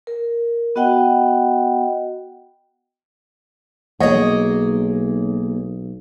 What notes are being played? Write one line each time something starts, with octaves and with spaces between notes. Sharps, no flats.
A#4
B3 F#4 D#5 F#5 G5
B1 A#3 G#4 C#5 D#5